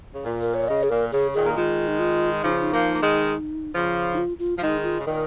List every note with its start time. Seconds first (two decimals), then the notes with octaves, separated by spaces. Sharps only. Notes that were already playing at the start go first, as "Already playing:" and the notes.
0.14 C#3
0.25 A#2
0.41 A#4
0.54 C#5
0.68 C#3 D#5
0.83 G#4
0.90 A#2 A#4
1.12 C#3 G#4
1.34 A#2 D#3 G#4
1.46 A#3
1.56 D#3 G#3 F4
1.87 D#4
1.99 F4
2.42 C#3 F3 D#4
2.60 D#4
2.72 F3 A#3
2.94 A#3
3.02 D#3 G#3
3.74 C#3 F3
4.14 D#4
4.18 F4
4.39 F4
4.57 F3
4.62 D#3 G#3 D#4
4.83 F4
4.99 C#3
5.05 A#2 D#3 A#4